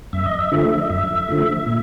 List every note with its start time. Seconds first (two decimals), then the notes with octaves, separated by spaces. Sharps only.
0.13 F#2 E5
0.26 D#5
0.39 E5
0.52 D3 F3 A3
0.81 D#5
0.90 F#2 E5
1.28 D3 F3 A3
1.66 A#2